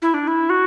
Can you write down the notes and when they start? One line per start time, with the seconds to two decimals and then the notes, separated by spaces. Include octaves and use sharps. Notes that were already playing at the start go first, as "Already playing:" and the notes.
0.02 E4
0.14 D4
0.27 E4
0.50 F#4